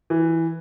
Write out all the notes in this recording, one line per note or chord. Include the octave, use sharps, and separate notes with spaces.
E3